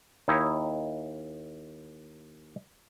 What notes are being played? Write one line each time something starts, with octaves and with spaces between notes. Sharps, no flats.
D#2 D#4 E4 C#5